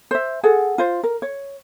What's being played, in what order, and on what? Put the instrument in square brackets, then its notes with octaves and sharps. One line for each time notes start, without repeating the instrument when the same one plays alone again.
[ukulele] C5 E5
G#4 A4 F#5
F4 C5
A#4
C#5